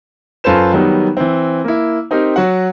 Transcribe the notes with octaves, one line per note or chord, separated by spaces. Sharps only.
F#2 F4 A4 B4 C5 E7
D#3 F#3 G3 B3 D#4
E3 C4
A#3 E4
C4 D#4 G4 A#4
F#3 F#4 F#5